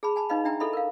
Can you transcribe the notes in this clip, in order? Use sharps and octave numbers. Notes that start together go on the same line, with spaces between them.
G#4 A5 B5
G#5 A5 B5
D#4 B4 D#5 F5 B5
D4 E5 G5 A#5
E4 A4 D#5 E5 B5
A#4 F5